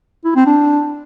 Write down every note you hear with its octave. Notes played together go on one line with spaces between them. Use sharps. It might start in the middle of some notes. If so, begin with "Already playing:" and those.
E4
C4
D4